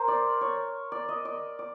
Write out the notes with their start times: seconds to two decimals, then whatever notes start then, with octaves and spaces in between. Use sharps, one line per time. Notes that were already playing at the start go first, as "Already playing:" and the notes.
Already playing: A#4 C5
0.08 D5
0.41 C#5
0.92 D5
1.09 D#5
1.25 D5
1.59 D5